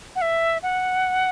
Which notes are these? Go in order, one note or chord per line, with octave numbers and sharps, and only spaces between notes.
F#5
E5
F#5